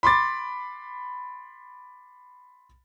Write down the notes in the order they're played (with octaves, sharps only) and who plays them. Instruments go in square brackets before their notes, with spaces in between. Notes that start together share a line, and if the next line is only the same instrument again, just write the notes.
[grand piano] B5 C6 D6 A6